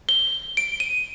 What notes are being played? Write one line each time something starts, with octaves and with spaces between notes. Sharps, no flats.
G7
D7
D#7